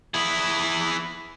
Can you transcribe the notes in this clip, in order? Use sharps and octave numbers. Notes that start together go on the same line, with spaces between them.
E4 G#4